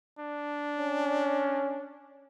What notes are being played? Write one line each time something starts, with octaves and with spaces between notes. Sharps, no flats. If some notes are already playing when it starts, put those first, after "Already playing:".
D4
C#4